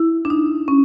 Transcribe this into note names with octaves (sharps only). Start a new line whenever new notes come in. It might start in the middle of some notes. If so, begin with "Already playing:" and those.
Already playing: E4
D4
D#4
C#4